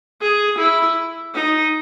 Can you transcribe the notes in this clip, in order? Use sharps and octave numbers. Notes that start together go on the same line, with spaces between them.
G#4
E4
D#4